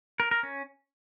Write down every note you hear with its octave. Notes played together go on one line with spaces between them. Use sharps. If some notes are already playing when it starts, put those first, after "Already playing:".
A#4
A#4
C#4